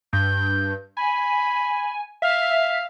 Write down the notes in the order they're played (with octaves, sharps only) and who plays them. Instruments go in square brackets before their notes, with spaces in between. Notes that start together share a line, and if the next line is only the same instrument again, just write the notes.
[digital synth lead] G2 [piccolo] G6
[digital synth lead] G#5 [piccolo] B5
[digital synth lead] E5 [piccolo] F5